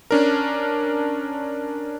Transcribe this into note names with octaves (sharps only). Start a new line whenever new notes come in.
C#4 D4 A#4